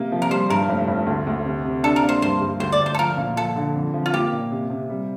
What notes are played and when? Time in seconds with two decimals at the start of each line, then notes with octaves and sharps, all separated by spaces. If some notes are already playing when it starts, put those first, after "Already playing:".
Already playing: C3 A#3
0.12 F3
0.22 A#4
0.31 G3 C5
0.50 G2 A#4
0.69 F1
0.88 F1
1.07 D2
1.27 D2
1.45 C3
1.65 C3
1.83 D4 A4
1.96 A#4
2.03 A#3
2.09 C5
2.22 G2 C5
2.41 G2
2.60 D2 C5
2.72 D5
2.80 D2
2.86 C5
2.94 A4
2.99 F3 A#4
3.17 A#2
3.36 F3 A4
3.56 D3
3.75 F2
3.94 F3
4.06 F4
4.13 A#3 G4
4.32 A#2
4.51 C3
4.70 C3
4.90 G3